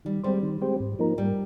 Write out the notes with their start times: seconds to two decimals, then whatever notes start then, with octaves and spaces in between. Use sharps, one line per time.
0.05 D#3 G3
0.24 G3 G#3 C4 G4 C5
0.43 D#3
0.62 G#3 C4 G4 C5
0.80 G#2
0.99 F3 A#3 D#4 A#4
1.18 G#2 G3